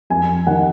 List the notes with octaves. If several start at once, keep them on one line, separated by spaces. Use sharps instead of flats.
F2 G#5
D#3 F#5